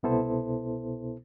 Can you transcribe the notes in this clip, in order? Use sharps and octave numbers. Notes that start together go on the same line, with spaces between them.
C2 B2 B3 E4 A4 C5